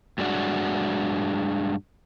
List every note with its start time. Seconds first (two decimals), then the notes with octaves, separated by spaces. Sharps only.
0.18 G2 F#3 G#3 D4 F#4